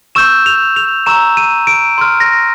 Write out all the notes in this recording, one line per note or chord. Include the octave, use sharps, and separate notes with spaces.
C#6 E6 G6 E7
F7
F7
A#5 C#6 E6 E7
D#7
D7
C6 F6
A#6